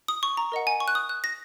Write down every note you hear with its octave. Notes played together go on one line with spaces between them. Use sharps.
D#6
C#6
A#5
A#4 D#5 F#5
G#5
C#6
F#6
D#6
F#6
A#6